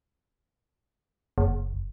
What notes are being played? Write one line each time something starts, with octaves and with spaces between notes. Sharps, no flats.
F#1